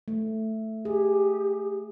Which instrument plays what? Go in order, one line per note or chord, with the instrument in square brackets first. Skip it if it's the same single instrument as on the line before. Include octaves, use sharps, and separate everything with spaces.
[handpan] A3
[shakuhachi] G4 [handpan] G#4